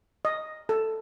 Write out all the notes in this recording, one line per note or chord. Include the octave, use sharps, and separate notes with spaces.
D#5
A4